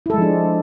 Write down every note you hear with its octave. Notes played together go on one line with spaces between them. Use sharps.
F3 G#3 D4 E4 A4